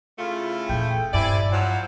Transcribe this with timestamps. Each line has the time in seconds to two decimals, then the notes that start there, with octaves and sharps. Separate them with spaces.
0.19 C#3 A3 E4 F4
0.69 E2 A#2 G5
1.14 G2 C3 E4 D5 G#5
1.52 F3 F#3 C5 F#5